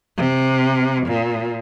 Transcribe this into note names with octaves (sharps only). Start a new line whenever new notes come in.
C3
A#2